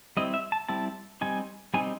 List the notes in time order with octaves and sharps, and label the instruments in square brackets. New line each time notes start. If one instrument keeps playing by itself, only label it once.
[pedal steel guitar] G3 C4 E4 D#5
E5
A5
G3 C4 E4 A5
G3 C4 D#4 G#5
G3 C4 D#4 G#5